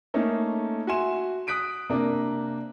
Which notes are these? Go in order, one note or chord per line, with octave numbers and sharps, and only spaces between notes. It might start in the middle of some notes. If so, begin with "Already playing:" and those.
A3 A#3 C#4 D#4 A4
F#4 E5 G#5 C6 E7
D#6 F#6 B6 D7 D#7
C3 A#3 D4 A#4